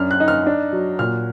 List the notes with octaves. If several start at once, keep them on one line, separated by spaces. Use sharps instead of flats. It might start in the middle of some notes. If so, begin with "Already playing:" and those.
Already playing: F#2 D4 F6
F#6
D#4
F6
D4
F#3
A#2 F6